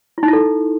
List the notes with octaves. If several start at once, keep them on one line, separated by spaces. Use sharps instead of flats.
E4
D#4
E4
A4